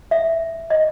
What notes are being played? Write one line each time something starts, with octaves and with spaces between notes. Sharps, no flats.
E5
D#5